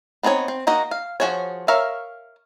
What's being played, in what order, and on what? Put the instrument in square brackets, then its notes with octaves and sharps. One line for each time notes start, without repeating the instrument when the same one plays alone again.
[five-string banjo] B3 C4 D#4 G#4 C#5
C4
A#3 D#4 F#4 D#5
F5
F3 C4 F#4 G#4 C#5
A#4 C#5 E5 F5